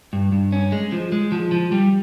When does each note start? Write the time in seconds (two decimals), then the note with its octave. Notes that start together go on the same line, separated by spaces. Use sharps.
0.13 G2
0.32 G2
0.52 C#4
0.72 G#3
0.92 F3
1.12 G#3
1.32 F3
1.52 F3
1.72 G3